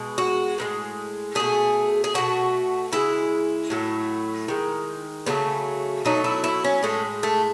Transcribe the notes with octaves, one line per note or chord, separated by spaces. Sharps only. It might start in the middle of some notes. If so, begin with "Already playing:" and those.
Already playing: B2 G#3
F#4
A2 E3 G#3
B2 A3 G#4
G#4
B2 A3 F#4
C#3 G#3 E4
A2 F#3 A3
D#3 G#3
C#3 F#3 A3 B3
B2 F#3 A3 D#4
E4
E4
C#4
A2 G#3 A3
A3